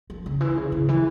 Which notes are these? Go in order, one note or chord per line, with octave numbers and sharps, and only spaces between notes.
F3
C#3
E3
C#3
C#3
E3